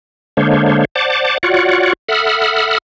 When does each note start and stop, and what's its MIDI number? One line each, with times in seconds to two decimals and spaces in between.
0.37 0.85 50
0.37 0.85 56
0.37 0.85 58
0.37 0.85 62
0.37 0.85 72
0.37 0.85 73
0.95 1.38 72
0.95 1.38 74
0.95 1.38 78
0.95 1.38 81
0.95 1.38 86
1.43 1.93 65
1.43 1.93 66
1.43 1.93 73
1.43 1.93 74
1.43 1.93 78
2.09 2.78 69
2.09 2.78 76
2.09 2.78 78
2.09 2.78 83
2.09 2.78 87
2.09 2.78 89